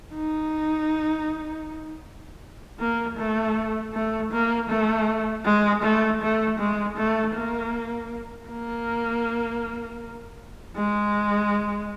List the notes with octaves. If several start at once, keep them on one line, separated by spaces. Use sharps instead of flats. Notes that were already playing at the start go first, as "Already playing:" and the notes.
D#4
A#3
A3
A3
A#3
A3
G#3
A3
A3
G#3
A3
A#3
A#3
G#3